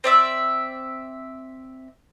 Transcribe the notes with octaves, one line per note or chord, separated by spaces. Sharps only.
C4 D5 E5